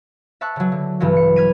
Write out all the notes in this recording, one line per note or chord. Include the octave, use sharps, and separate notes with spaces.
E5 A5 C#6 F#6
C#3 F#3
D3
B1 G2 C#3 E3 F#3
C#7
F6 G#6 B6 D#7